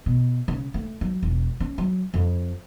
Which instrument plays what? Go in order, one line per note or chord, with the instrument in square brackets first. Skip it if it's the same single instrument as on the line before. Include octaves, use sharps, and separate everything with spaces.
[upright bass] B2
C#3
A3
F#3
E1
C#4
F#3
F2